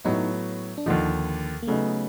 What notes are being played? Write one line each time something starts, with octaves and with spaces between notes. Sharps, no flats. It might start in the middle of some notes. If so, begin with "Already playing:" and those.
A2 F#3 B3 D#4
D4
D#2 D3 F3 D#4
A#3
C#3 F#3 A3 B3 D#4